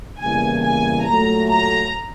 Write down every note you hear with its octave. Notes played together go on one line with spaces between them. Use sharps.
E2 C#3 E3 G3 A#3 G#5
G#5
A#2 F#3 A3 A#5
A#5